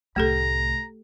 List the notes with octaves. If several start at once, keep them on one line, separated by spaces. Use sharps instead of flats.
C2 A2 A3 G4 A4 A#5